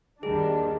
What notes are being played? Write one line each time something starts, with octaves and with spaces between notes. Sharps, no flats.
D#2 D#3 G3 D4 G#4